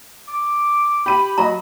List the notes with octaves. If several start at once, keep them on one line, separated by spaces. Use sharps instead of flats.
D6
G4 B5 D#7
F#3 D#5 A#5